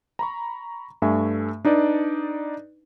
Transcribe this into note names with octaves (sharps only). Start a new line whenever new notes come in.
A#5 B5 C#6
G2 A3 E5 G#5
D4 D#4 B4 D5